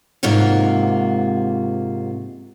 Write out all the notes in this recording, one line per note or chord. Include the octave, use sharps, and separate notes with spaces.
G#2 C3 A#3 F4 F#4